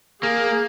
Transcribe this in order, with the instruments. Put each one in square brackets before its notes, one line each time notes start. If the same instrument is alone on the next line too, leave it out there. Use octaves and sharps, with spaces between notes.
[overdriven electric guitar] A#3 [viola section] G#4